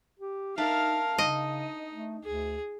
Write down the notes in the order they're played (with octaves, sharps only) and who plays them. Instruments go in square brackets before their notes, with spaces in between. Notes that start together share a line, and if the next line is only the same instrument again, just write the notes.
[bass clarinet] G4
[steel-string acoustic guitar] D4 E5 A5 [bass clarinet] D#4 [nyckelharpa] A#4 F5
[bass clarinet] C#3 [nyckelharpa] D#4 [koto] D#5
[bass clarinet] A3
[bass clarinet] D2 [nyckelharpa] G#4